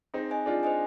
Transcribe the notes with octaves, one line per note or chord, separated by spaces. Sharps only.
C4 D#4 G#4
C5 D#5 G#5
D4 F4 G#4
C5 D#5 G#5